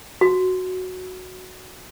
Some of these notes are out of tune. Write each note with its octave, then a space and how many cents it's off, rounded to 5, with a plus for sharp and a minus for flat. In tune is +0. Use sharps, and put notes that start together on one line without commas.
F#4 -5